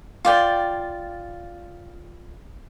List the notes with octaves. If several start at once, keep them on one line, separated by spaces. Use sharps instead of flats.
F4 D5 G5